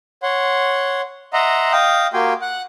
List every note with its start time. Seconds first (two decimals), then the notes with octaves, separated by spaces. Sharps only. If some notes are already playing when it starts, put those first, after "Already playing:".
0.23 C#5 F#5 C6
1.33 D#5 E5 F#5 A#5 C6
1.73 D#5 F5 G5 D#6
2.13 A#3 F#4 G4 G5 G#5 C6
2.42 F#5 F#6